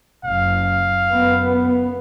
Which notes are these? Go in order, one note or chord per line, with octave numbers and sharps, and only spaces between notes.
F#1 F5
F#2 B3